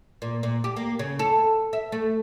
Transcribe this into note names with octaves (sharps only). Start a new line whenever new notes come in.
A#2
A#2
G4
A#3
C#3
A4
E5
A3